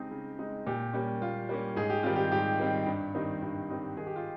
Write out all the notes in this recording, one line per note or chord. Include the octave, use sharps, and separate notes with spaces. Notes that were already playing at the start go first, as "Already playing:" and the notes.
Already playing: C#3 G#3 C4 D#4 G4
C#3
G#3 C4 D#4
A#2 G4
G3 A#3 C#4
A#2 F4
G3 A#3 C#4
G#2 G#4
G4
D#3 G3 C4 F4
G4
G#2 G4
D#3 G3 C4
G2
D#3 G3 C4 D#4
G2
D#3 G3 C4 D#4
D#3 G#4
G4
F4